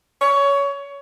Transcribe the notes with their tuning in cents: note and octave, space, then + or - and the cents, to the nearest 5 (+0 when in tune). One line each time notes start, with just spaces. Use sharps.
C#5 +20